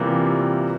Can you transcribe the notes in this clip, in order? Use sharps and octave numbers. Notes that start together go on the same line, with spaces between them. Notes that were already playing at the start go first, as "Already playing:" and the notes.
Already playing: C3 E3 G3 A#3 F4